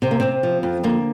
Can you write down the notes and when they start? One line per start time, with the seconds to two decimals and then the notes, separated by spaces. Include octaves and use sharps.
0.02 C3 C4
0.11 A#3
0.20 C3 C4
0.43 F3
0.63 F2
0.83 D3 A#3